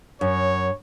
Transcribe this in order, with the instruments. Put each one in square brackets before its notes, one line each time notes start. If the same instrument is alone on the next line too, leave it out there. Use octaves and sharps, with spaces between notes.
[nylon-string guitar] F#2 [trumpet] C#5